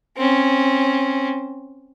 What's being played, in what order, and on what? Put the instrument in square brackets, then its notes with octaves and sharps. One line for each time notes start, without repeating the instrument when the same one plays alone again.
[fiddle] C4 C#4